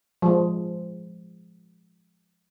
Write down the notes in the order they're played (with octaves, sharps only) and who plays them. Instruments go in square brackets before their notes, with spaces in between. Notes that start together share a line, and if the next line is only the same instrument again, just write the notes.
[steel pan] F3 G#3